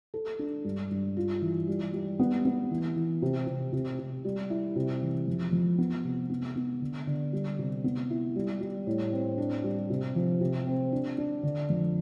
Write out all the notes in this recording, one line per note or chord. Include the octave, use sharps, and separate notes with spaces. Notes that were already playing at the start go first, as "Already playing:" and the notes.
A4
D4
G2
G2
F4
E3
G3
G3
B3
B3
E3
E3
C3
C3
C3
C3
G3
E4
C3
E3
F2
F2
B3
C3
B3
B3
D3
D3
G3
C3
B3
E4
G3
G3
A2
C4
D4
G3
C3
F3
C3
C4
D4
D4
D3
F2